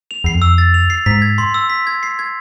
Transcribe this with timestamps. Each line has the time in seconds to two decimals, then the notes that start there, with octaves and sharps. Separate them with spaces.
0.11 F7
0.24 E2 C7
0.34 F2
0.42 E6
0.58 A6
0.74 F7
0.90 C7
1.06 G#2 B6
1.22 G#6
1.38 C6
1.54 E6
1.70 B6
1.87 G#6
2.03 C7
2.19 G#6